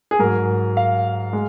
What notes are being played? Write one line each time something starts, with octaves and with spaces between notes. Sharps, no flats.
G#4
G#2 F#3 A#4
F5
G#3